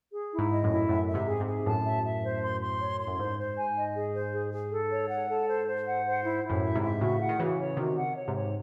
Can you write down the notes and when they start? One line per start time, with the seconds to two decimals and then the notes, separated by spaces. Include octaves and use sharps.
0.13 G#4
0.32 E4
0.39 G#2
0.51 D#5
0.64 F#2 A2
0.70 E4
0.89 F#2 A2 E5
1.08 E5
1.14 G#2 C3
1.27 G#4
1.40 G#2 C3
1.46 G#4
1.66 F#2 A2 A5
1.85 E5
2.04 E5
2.23 C5
2.42 C6
2.61 C6
2.80 C#5
3.00 C6
3.07 F#2
3.18 G#2 C5
3.38 C5
3.57 G#5
3.76 D#5
3.95 G#4
4.14 C5
4.33 G#4
4.53 G#4
4.72 A4
4.91 C#5
5.10 F#5
5.29 A4
5.48 C5
5.68 C5
5.86 F#5
6.06 C5
6.25 E4
6.43 E4
6.50 F#2 A2
6.63 E5
6.75 G#2 C3
6.82 E5
7.01 A2 C#3 F#4
7.20 F#5
7.29 D#3
7.39 C#3 E3 F#4
7.58 C#5
7.77 C3 D#3 F#4
7.97 F#5
8.16 C#5
8.28 G#2 C3
8.35 C#5